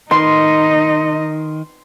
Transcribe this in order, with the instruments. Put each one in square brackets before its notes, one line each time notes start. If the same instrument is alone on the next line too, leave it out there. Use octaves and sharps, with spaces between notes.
[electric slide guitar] D#3 [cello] D#4 D#5 [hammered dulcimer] C6